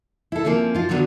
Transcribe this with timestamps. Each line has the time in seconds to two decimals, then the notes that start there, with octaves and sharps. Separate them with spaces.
0.32 E4 A4
0.45 F3 A#3 C4 C#4
0.75 F3 F4
0.89 G2 D3 F3 F#3 B3 D4